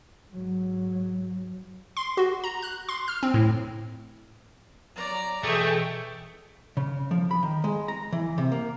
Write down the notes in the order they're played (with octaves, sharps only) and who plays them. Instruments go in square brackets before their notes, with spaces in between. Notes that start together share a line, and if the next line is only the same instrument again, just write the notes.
[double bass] G#2 F#3
[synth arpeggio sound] C6
F#4
A#5
F#6
C6
F6
C4
A2
[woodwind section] F#3 [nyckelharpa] D5 A#5
[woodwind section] B2 E3 [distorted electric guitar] A3 [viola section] G#4 A4 G5 [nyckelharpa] C#5 E5
[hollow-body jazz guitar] C#3
F3
B5
D#3
G#3
A#5
E3
C3
A#3